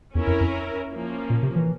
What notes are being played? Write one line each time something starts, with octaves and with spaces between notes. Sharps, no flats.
E2 C#4 E4 A#4
F2
F2
F3 A#3 C#4
A#2
C3
E3